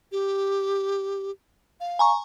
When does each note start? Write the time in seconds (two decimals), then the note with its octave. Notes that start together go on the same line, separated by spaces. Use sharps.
0.12 G4
1.80 F5
1.99 G#5 A#5 C#6